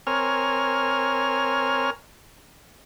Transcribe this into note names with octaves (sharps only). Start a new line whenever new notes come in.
C4 A#4 C#5 G#5 F6